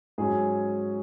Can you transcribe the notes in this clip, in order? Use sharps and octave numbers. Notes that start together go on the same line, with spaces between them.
G#2 F#3 C#4 G#4 G#5